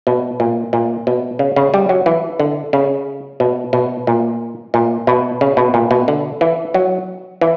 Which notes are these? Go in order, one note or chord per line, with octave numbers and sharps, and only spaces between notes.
B2
A#2
A#2
B2
C#3
C#3
G3
F#3
E3
D3
C#3
B2
B2
A#2
A#2
B2
C#3
B2
A#2
B2
D3
E3
F#3
E3